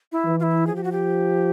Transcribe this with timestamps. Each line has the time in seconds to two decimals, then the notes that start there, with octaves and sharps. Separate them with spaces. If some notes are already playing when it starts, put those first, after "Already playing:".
0.12 E4
0.25 E3
0.40 F4
0.43 E4
0.67 F3 G#4
0.76 G4
0.84 F#4
0.92 G4